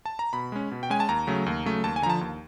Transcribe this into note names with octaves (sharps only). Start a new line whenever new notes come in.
A5
A#5
B2 B5
G#3 C#4
B2
G5
G#3 C#4 G#5
A5
D#2 A#5
C#3 F#3 A3
D#2
C#3 F#3 A3
D#2 A5
G#5
D3 F3 A5 A#5
D#2